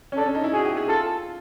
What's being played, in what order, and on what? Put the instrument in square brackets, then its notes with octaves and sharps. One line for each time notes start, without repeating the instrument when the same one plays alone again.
[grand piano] C#4
[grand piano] D4 [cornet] A4
[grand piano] C#4
D#4
E4
[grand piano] F#4 [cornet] G#4
[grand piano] G4
G#4
[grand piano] F4 [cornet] A4